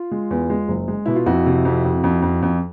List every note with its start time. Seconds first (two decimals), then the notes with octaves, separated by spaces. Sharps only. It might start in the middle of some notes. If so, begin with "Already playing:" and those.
Already playing: F4
0.12 G#3
0.31 E2
0.50 G#3
0.68 F#1
0.88 G#3
1.06 B2 E4
1.16 F4
1.26 F2 E4 F#4
1.46 C3
1.65 F2
1.85 F2
2.04 F2
2.22 F2
2.42 F2